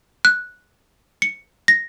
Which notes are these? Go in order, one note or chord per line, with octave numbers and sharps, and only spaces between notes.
F#6
C#7
A#6